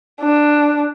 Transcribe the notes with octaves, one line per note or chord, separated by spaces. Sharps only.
D4